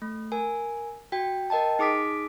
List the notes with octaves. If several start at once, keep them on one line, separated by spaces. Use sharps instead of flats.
A3
A#4 G#5
F#4 G5
A#4 D#5 G5 A5
D#4 G#4 D6 D#6 B6 D7